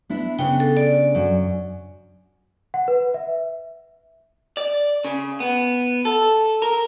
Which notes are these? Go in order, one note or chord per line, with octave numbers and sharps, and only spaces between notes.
B3 D4 E4
C#3 B3 D4 G5
A4
D5
F#2
F#5
B4
E5
D5
C#3
B3
A4
A#4